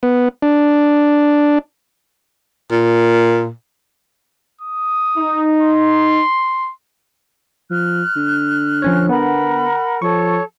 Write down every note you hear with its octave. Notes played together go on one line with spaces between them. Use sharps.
B3
D4
A#2
D#6
D#4
C6
F3 F6 F#6
D3
F3 C#4 C#5
B3 A#4 F#5 B5
F3 A4 C#5 C#6